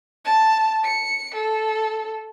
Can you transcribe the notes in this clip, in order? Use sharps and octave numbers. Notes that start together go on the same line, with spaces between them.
A5
C#7
A4